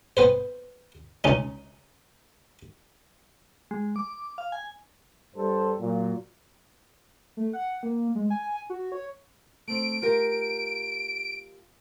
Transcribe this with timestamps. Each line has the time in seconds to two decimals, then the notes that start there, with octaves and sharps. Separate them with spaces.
0.17 B3 B4 C5
1.24 C#2 C#4 D#4
3.71 G#3
3.96 D6
4.38 F5
4.52 G#5
5.35 G2 G3 A4 C5
5.80 A#2 F#3
7.37 A3
7.53 F#5
7.83 A#3
8.15 G#3
8.30 G#5
8.70 F#4
8.92 C#5
9.68 A3 C4 D7
10.02 F4 G4 A#4